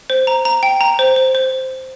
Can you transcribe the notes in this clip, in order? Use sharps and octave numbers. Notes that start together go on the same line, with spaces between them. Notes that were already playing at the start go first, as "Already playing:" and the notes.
C5
A#5
A#5
G5
A#5
C5
C5
C5